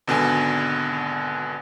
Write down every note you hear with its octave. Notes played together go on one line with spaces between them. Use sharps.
G#1 B2 D3 G#5